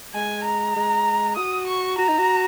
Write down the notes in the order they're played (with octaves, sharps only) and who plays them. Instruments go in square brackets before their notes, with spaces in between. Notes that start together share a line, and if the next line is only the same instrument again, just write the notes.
[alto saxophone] G#3 [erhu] G#5
[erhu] A#5
[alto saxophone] G#3
[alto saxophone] F#4 [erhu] D#6
[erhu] C#6
[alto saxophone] F#4 [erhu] A#5
[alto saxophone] D#4
F#4